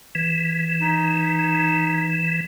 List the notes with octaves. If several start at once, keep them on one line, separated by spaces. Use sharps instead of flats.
E3
D#4